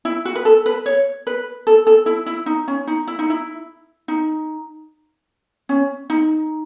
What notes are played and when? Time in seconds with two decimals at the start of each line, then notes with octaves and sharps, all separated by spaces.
0.05 E4
0.25 F#4
0.36 B4
0.45 A4
0.66 B4
0.86 C#5
1.27 B4
1.67 A4
1.87 A4
2.06 E4
2.26 E4
2.46 D#4
2.68 C#4
2.87 D#4
3.08 E4
3.19 D#4
3.30 E4
4.08 D#4
5.69 C#4
6.10 D#4